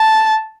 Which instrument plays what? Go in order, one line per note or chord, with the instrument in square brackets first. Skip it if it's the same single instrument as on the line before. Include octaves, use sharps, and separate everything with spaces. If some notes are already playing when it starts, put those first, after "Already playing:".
Already playing: [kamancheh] A5